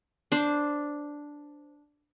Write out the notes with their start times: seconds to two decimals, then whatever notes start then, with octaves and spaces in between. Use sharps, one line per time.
0.32 D4 C5